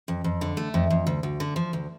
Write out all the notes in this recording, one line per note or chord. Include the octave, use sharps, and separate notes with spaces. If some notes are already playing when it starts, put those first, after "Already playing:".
F2
F2
D3
A3
F2
F2
D2
D2
D3
F3
D2